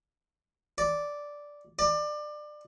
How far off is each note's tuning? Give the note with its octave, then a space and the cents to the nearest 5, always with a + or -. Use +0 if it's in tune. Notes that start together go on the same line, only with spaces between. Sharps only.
D5 -5
D5 +25